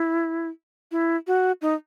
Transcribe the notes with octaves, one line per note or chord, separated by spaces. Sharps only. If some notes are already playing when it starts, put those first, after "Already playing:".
Already playing: E4
E4
F#4
D#4